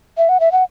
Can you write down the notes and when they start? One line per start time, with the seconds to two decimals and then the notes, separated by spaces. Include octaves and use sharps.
0.18 E5
0.29 F#5
0.40 E5
0.52 F#5